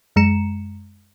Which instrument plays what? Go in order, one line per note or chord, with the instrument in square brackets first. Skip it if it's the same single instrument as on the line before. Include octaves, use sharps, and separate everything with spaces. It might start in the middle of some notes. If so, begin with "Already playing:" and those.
[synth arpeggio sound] F#2 G#3 A#5 C#7 E7